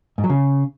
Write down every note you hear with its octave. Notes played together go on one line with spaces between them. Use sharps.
G#2
F#3
C#3